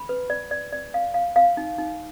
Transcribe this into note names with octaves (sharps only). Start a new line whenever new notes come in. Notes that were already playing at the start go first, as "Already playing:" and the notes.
Already playing: B5
B4
D5
D5
D5
F5
F5
F5
D#4
D#4